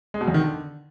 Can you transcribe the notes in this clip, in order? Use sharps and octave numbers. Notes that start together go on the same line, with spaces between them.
G#3
B2
E2
D#3
D3